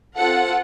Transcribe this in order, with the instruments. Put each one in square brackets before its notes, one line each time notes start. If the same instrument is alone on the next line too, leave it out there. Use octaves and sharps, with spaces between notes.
[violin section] C4 F4 A4 F#5